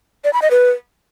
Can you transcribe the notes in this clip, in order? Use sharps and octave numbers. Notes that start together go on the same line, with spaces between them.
D5
B5
D#5
B4